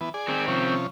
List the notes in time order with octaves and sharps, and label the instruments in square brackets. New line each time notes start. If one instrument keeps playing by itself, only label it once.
[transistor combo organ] E3 B3
G#4 D5
[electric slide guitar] D#3 C4
[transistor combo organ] C3 F3 C#4